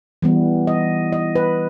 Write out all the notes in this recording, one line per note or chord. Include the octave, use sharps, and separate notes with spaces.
E3 G3 B3
D#5
D#5
B4